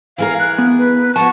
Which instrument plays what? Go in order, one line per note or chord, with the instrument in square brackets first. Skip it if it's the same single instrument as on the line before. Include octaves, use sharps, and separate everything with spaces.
[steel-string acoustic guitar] E3 G#4 A#4 [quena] F5
[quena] F#6
[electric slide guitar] B3
[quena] B4
[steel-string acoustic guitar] F3 F#4 [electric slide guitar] A5 [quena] C#6